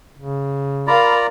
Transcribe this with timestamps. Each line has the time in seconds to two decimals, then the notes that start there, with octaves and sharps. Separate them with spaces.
0.18 C#3
0.87 F4 A#4 D5 F5 A#5 B5